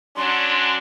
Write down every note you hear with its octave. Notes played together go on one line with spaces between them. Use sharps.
F#3 C#4 D4 C6